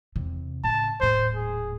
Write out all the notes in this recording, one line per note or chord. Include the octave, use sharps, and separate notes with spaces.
E2 C3
A2 C#3 A5
D#1 A2 C5
G#4